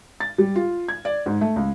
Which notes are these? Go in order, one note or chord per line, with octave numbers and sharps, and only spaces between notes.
A6
G3
F4
G#6
D5
G#2
A3
C#2